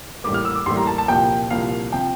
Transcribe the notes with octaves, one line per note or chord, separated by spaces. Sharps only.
A1 A2 G3 A#3 D6
F6
E6
D6
A1 A2 G3 A#3 C6
A#5
A5
A5
C2 A#2 F3 A#3 G5
C2 A#2 F3 A#3 F5
C3 F3 G5